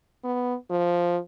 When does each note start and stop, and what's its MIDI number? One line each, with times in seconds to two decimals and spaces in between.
0.24 0.54 59
0.70 1.18 53